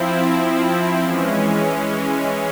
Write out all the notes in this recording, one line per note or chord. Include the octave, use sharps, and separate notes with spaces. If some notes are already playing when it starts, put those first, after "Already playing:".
Already playing: F3 C4 E4
E3 G#3 C#4